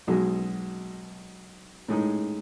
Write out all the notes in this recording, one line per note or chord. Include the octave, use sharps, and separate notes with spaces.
B1 B2 G#3
A2 G#3 D#4 G#4